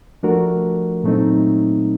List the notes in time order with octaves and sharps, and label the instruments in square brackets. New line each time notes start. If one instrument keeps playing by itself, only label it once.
[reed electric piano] F3 A3 D4 F#4 A#4
A#2 F#3 A3 C4 D#4